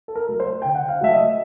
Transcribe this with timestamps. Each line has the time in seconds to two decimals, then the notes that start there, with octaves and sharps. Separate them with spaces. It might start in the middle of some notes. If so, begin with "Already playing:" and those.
0.08 A4
0.16 A#4
0.29 F#3 A3
0.40 C5
0.62 D3 G5
0.75 F#5
0.88 F5
1.01 F#3 A3 E5
1.13 D#5